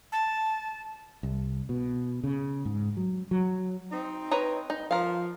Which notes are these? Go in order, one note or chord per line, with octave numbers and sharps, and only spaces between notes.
A5
C2
B2
C#3
G#2
F#3
F#3
C4 D#4
B4 C#5 A#5
D#4
F3 A#4 F5